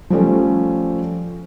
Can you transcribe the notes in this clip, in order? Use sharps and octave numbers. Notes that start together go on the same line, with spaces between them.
F3 G3 A3 C#4